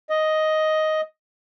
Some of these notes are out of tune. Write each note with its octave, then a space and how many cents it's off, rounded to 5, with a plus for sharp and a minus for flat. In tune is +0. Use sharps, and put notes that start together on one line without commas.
D#5 +5